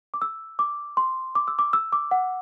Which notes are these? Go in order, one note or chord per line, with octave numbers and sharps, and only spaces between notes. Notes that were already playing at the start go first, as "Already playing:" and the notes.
D6
E6
D6
C6
D6
E6
D6
E6
D6
F#5